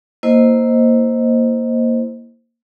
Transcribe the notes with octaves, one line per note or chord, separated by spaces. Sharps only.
A#3 E4 C5 D#5